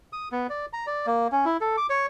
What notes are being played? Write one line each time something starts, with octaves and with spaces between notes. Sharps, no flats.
D#6
B3
D5
A#5
D5
A#3
C#4
E4
A4
D6
C#5